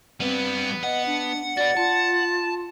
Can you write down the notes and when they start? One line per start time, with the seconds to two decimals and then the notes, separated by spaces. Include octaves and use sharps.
0.20 G3 B3 C4 B4
0.84 D#5 F#5
1.06 D4
1.57 F#4 B4 D5 A6
1.77 F4 A5